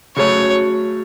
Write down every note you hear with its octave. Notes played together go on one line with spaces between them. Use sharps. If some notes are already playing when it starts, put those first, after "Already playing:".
C#3 F#3 A3 C#5